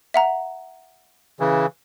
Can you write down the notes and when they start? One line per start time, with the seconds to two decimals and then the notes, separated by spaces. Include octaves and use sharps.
0.14 E5 F#5 A#5
1.40 C#3 E3